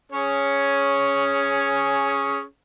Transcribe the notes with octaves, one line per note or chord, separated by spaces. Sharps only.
C#4 G#4 C#5